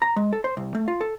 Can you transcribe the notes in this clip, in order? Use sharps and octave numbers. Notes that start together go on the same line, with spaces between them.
A#5
G#3
A4
C5
C2
A3
F4
A4